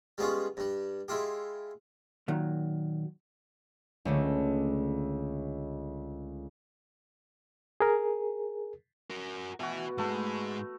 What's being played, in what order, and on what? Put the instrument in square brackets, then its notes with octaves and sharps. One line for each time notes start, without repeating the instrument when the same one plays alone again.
[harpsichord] G3 G#3 B3 C#4 F4
G2 G3
G#3 E4 F4 G4
[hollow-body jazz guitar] A#2 D#3 F#3
[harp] C#2 D3 A3
[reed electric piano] G#4 A#4
[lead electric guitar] F#4 A#4
[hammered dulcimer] B2 F#4 [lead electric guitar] B4 E5
[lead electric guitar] G#2 G#3 [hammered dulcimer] A3 B4